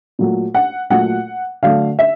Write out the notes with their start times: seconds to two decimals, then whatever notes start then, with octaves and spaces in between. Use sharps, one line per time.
0.19 A#2 F#3 A3
0.55 F#5
0.90 A#2 F#3 A3 F#5
1.63 D3 F#3 A3 F5
1.99 E5